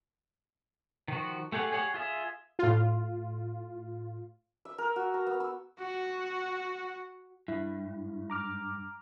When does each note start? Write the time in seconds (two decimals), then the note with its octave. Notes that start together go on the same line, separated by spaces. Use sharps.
1.08 D#3 F3 F#4
1.52 A3 G4 G#4 F#5
1.71 G4 G#4 C#5 F#5
1.94 F4 G#4 E5
2.59 A2 F4
4.65 E5
4.78 A#4
4.96 F#4
5.14 A#5
5.27 B3
5.40 E6
5.79 F#4 F#5
7.48 G2 E4
8.30 A#5 D6 F6